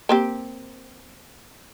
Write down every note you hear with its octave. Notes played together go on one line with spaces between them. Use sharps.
A#3 C4 G4